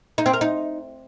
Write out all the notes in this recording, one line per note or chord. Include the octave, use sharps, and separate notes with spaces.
D#4
C4
A#4
D#4